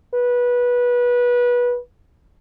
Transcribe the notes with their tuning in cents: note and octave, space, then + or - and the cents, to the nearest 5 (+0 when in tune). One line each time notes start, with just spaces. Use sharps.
B4 -20